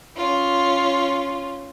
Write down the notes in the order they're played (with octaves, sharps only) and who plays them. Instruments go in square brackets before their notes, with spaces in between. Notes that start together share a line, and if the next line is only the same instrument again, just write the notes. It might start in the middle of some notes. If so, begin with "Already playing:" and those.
[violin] C#4 F4